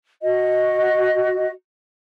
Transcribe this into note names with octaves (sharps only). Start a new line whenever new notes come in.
F#4 D#5